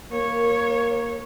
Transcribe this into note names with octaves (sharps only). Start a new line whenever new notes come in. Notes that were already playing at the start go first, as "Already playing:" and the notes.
A#3 A#4 C#5